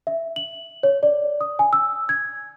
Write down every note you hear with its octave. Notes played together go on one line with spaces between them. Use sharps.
E5
F#7
C#5
D5
D#6
G#5
E6
G#6